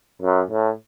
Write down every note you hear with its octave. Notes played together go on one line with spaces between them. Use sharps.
F#2
A2